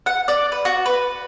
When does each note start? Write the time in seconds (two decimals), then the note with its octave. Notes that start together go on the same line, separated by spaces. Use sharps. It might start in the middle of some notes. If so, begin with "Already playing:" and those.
0.06 F#5
0.28 D5
0.52 B4
0.65 F#4
0.86 B4